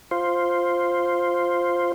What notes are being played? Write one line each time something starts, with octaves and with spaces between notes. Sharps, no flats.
F4 C5